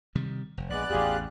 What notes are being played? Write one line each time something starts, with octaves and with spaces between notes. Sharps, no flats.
C3 D#3 G3
F1
A#1 G#3 B3 D5 F#6
A1 E2 F4 G4 G#4